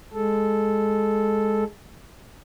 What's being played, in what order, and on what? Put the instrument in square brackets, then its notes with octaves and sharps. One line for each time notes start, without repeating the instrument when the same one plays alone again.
[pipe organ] G#3 A4